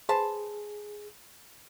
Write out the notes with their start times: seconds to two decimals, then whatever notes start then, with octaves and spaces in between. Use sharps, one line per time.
0.09 G#4 B4 C5 A5